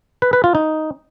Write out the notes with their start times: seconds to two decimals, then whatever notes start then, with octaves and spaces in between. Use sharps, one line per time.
0.22 B4
0.33 B4
0.44 F4
0.55 D#4